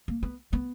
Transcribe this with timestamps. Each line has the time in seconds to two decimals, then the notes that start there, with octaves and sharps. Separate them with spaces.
0.08 A#3
0.23 B3
0.53 B3